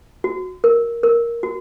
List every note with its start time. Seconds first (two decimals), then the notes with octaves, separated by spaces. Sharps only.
0.24 F#4
0.64 A#4
1.03 A#4
1.43 F#4